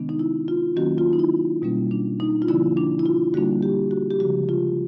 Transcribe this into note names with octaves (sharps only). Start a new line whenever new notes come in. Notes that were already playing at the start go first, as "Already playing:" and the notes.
Already playing: C3 D#3 G#3 B3 D4
D#4
E4
F4
D#3 F#3 A#3 C#4 F#4
F4
D#4
E4
B2 G3 A#3 C#4
D4
D#4
F4
D3 F3 A#3 D4 E4
D4
E4
F4
D3 G3 A#3 D4 F#4
G4
F#4
G4
C#3 F3 G#3 F#4
F4